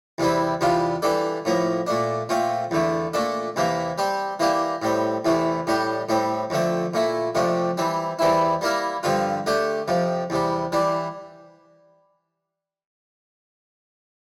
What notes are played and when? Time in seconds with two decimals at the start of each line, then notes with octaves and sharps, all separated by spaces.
0.18 E2 C3 G3 C4 E4
0.61 E2 C3 G3 D4 F4
1.02 E3 G3 D4 A4 D5
1.45 A2 F3 A#3
1.87 A#2 A3 D4
2.29 A#2 A3 C4 F4
2.71 E2 D3 A3
3.14 A#2 A3 D4 A4
3.56 E2 C3 E3 A#3
3.98 G3 C4 G4
4.40 E3 A#3 D4 G4
4.82 A2 G3 C4
5.25 E2 C3 E3 A3
5.67 A2 G3 D4 G4
6.09 A2 G3 C4
6.50 F2 D3 A3 C4
6.94 A#2 A3 E4
7.35 F2 C3 F3 A3 D4
7.77 E3 G3 C4
8.19 E2 E3 G3 C4 E4
8.61 G3 A#3 E4 A#4
9.03 G2 D3 F3 C4 F4
9.46 D3 A3 D4 G4
9.88 F2 C3 F3
10.30 E2 C3 G3
10.72 E3 G3 D4